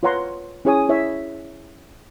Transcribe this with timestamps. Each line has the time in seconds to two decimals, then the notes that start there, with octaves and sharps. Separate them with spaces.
0.03 F4 B4 C#5 F#5 A#5 C6
0.65 C#4 E4 G#4 C#5 G#5 D#6
0.89 E4 C#5 D5 E5